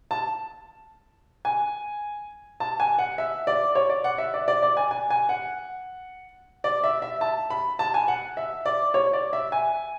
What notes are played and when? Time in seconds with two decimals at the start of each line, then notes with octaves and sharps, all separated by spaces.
0.11 A5
1.45 G#5
2.60 A5
2.80 G#5
2.99 F#5
3.18 E5
3.47 D5
3.75 C#5
3.90 D5
4.04 F#5
4.18 E5
4.34 D5
4.48 D5
4.63 D5
4.77 G#5
4.91 G#5
5.10 G#5
5.29 F#5
6.64 D5
6.84 E5
7.02 E5
7.21 A5
7.50 B5
7.79 A5
7.94 G#5
8.08 F#5
8.37 E5
8.65 D5
8.94 C#5
9.13 D5
9.33 E5
9.52 G#5